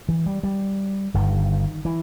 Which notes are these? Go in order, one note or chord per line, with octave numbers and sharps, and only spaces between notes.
E3
G3
G3
G1 G2 D#3
E3